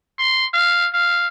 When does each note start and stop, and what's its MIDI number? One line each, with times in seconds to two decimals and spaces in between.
0.19 0.46 84
0.53 0.88 77
0.93 1.27 77